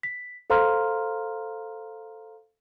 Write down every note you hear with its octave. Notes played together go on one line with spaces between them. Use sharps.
B6
A4 C5 F5 A#5 C6 F6